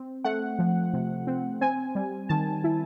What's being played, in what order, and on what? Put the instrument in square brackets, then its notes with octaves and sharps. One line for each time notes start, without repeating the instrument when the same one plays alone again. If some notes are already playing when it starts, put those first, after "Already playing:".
Already playing: [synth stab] C4
A3 F#5
F3
C3
C4
C4 G#5
G3
D#3 A5
E4